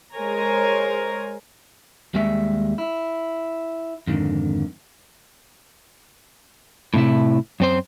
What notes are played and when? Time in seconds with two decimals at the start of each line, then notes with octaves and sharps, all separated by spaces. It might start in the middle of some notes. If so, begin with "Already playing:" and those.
0.14 G#3 A#4 C5 C#5 G#5 A#5
2.14 D#2 G3 G#3 E5
2.78 E4
4.07 F2 G#2 D3 D#3
6.94 A2 C3 E4
7.60 F#2 C4 C5